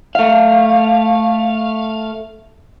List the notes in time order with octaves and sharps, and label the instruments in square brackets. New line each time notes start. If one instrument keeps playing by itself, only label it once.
[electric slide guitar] A3 F5